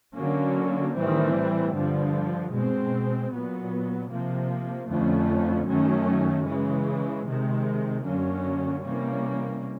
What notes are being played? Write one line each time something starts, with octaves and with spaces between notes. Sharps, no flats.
D3 F#3 A#3 C#4
A2 E3 G3 C4
G2 D3 F3
B2 G#3 C4
A#2 F#3 B3
C3 F3 A#3
F2 D3 F3 A3 C#4
F#2 D#3 F#3 A3 C#4
C#3 E3 G#3
C3 D#3 G#3
F#2 D3 F#3 A#3 C#4
C3 E3 G3 A#3 C#4